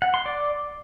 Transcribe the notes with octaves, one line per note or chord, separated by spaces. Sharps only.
F#5
C6
D5